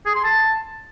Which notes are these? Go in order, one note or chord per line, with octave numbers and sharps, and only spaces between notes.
G#4
C6
A5